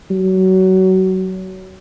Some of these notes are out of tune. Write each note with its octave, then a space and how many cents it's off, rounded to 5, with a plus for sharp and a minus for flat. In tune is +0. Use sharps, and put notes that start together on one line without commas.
F#3 +25